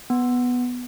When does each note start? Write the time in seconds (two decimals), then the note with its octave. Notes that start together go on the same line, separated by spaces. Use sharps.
0.10 B3